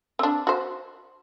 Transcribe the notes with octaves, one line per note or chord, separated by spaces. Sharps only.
C4 D4
F#4 C5